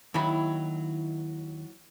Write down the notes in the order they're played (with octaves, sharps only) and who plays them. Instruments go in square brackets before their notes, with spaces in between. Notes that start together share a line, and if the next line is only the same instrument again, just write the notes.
[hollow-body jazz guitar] D#2 D#3 B5 [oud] F#3 E4